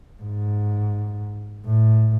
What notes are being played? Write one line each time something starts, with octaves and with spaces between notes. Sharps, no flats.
G#2
A2